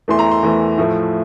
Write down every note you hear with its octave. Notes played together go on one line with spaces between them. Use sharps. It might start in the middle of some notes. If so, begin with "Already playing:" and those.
E2 E3 A3 C6
A#5
C6
E2 E3 A3
A2 F3 A3